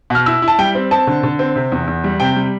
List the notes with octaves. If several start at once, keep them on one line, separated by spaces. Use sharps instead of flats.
B2 F6
E4 E6
E4
A5
G3 G5
C4
C4 A5
D3
D3
C4
C3
E2
E2
G3
C3 G5
G3